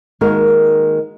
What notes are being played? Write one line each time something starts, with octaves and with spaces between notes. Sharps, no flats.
D#3 G#3 A#3 F#4 A#4